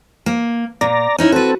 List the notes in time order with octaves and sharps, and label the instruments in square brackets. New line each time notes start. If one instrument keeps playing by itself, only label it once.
[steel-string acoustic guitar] A#3
[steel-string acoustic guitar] A#2 [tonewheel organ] D5 A#5
[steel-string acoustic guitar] C#4 D#4 E4
[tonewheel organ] C4 A4 [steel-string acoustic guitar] F#4 B4